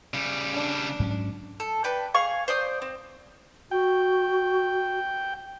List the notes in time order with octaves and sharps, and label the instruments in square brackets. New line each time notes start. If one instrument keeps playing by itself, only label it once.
[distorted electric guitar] C#3 G3
[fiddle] D4
[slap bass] G#2 F#3 C#4
[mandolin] A4
B4 D5 G5
G#4 F5 C#6
C5 D5 D#6
C4
[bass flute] F#4 [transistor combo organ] G5